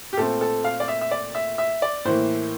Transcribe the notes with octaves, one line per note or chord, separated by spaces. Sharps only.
G4
A#2 A3 C4 A4
A4
F5
D5
E5
E5
D5
E5
E5
D5
A2 E3 A#3 C5